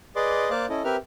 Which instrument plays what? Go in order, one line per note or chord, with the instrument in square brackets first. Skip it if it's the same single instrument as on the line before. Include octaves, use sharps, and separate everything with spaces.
[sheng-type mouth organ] G#4 B4 D5 D#5 C6 D6
A#3 C5 D5 F5 D6 F#6
C#4 E4 A4 D#5
C4 G4 A#4 B4 E5 F6